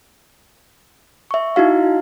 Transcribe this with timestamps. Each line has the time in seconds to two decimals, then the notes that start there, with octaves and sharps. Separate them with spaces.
1.31 E5 C#6
1.56 D#4 E4 F#4 F5